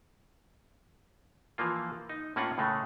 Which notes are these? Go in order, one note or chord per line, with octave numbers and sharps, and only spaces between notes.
E3 F3 A#3 F4
D#4
A2 A#3 C#4 F4 F#5
A2 C#3 G#3 A3